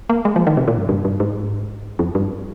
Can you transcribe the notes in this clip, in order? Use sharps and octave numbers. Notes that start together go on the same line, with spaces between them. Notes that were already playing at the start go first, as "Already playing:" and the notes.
A#3
G#3
F3
D#3
C3
A#2
G2
G2
G2
G#2
F2
G2